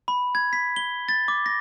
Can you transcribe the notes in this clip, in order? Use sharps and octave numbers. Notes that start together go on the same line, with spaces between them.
B5
G#6
B6
G7
A6
D6
A#6